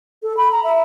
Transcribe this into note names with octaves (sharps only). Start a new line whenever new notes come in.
A4
B5
A#5
E5